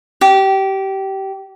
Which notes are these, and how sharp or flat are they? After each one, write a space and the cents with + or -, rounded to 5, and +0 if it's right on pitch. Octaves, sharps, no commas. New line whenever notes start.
G4 -20